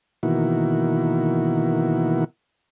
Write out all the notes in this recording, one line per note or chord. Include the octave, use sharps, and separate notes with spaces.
B2 D#3 E3 A#3 E4 F#4